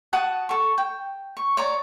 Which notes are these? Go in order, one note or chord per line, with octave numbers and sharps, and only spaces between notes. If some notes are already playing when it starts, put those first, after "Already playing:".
F#4 F#5 A5 D#6
A4 C#6
G5
C#6
C#5 D5 A#5